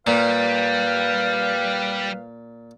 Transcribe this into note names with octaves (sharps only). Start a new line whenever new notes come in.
A#2 G3 B4 F5